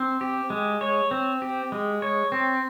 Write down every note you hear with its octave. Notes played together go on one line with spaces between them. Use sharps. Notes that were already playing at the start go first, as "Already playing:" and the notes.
Already playing: C4
G4
G#3
C#5
C4
G4
G#3
C#5
C4